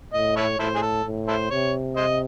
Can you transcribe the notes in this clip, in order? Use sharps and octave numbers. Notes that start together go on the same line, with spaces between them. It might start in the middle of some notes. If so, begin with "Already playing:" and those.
A2 D#5
E4 A4 C#5
A2 E4 A4 C5
G#4
A4
A2
E4 A4 C5
C3 C#5
C5 D#5